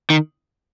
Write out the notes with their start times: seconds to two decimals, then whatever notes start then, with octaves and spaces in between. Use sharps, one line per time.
0.10 D#3